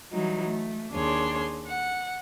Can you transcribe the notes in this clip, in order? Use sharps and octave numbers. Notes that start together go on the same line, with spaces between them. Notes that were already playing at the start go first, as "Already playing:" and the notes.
E3 F#3 G3 D#4
A3
D#2 D4 G#4 C#5 C6
F#5